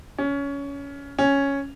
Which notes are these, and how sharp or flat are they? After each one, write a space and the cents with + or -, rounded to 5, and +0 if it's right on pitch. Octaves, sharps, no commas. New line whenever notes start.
C#4 +20
C#4 +0